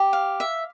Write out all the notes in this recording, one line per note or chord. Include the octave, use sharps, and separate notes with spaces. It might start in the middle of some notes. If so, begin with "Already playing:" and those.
Already playing: G4
F5
E5